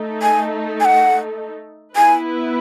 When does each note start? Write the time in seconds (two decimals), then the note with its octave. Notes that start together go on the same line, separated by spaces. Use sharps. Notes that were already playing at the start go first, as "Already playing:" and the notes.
Already playing: A3 D#4 A4
0.22 G#5
0.80 G#5
0.85 F#5
1.96 B3 E4 B4 G#5